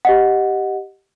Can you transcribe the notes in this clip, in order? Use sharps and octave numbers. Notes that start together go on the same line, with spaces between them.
G4 D#5 F#5